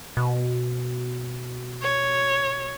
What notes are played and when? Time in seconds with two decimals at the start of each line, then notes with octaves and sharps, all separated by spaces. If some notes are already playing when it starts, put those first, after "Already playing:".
0.17 B2
1.82 C#5